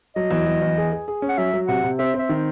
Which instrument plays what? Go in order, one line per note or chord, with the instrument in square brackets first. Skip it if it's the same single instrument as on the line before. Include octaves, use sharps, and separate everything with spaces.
[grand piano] F#3 [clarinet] D#5
[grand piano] E2
F#3
E2
G#4
G#4
G#4
C#4
[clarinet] F#5
[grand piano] F#3 [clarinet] E5
[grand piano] F#3
[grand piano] C3 [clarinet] F#5
[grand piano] C3
[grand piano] C4 [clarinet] E5
[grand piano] C4 [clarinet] E5
[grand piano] D#3